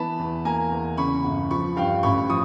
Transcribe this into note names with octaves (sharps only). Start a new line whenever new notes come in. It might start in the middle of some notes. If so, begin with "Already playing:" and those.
Already playing: E3 B3 A5 B5
E2
A#3 G#5 A#5
E2
C#3 B5 C#6
G1
F3 B5 C#6
G2 F5 G5
A1 B5 C#6
F3 C#6 D#6